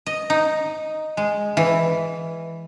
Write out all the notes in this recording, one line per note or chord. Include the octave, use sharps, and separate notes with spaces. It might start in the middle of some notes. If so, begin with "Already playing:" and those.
D#5
D#4
G#3
E3